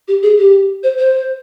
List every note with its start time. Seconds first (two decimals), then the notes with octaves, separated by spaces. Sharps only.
0.08 G4
0.23 G#4
0.38 G4
0.84 C5
0.98 C5